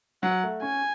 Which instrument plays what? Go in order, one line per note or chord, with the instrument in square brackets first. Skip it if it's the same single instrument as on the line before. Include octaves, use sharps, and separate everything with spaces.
[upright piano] F#3 [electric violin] F#5
[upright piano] A3
[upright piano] C#4 [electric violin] G#5